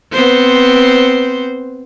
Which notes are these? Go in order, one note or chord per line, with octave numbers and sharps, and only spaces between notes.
B3 C4 C5